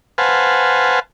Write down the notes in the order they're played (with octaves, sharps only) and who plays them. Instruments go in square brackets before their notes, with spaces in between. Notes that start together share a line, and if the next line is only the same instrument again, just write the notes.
[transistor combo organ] B4 C5 F5 F#5 G#5 A5